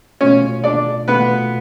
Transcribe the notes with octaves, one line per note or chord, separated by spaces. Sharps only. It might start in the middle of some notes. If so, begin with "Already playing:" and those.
B2 A3 C#4 F4 C#5
D4 D5
B2 A3 B3 F4 B4